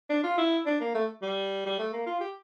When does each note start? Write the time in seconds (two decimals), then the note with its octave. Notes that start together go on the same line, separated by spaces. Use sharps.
0.10 D4
0.24 F4
0.37 E4
0.66 D4
0.80 A#3
0.95 A3
1.22 G3
1.66 G3
1.79 A3
1.93 A#3
2.06 F4
2.20 G4